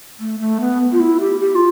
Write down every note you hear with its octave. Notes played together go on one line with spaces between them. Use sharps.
A3
A3
B3
F4
E4
G4
G4
F4